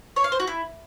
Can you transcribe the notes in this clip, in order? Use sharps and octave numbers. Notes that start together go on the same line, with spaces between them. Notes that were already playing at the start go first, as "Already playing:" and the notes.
C#5
F5
C5
F#4
E4